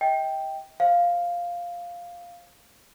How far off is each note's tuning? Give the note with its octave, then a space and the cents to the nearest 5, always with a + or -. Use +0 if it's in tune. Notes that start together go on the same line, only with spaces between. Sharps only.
D#5 +40 G5 +0
C5 +45 F5 +0